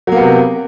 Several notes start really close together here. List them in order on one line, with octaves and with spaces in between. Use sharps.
F#3 A#3 B3 C3